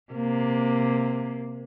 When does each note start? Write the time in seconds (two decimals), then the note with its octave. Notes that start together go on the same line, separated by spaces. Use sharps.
0.13 C3 A#3